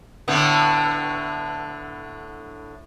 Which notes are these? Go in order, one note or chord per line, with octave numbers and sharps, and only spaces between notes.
A2 D3 B3